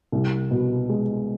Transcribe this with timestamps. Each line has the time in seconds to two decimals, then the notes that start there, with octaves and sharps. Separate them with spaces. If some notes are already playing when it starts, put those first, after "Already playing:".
0.12 C2
0.51 B2
0.89 G#3